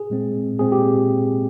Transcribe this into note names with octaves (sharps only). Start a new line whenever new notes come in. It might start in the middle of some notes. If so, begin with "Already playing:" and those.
Already playing: G#4
A#2 G#3 C4
A#2 G#3 C4 G#4
G4